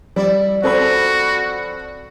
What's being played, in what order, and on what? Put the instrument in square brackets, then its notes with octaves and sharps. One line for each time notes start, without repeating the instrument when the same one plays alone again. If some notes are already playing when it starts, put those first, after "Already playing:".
[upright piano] G3 [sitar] E4 D5
[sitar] F3 D4 [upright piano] C4 A4 B5 [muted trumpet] F#4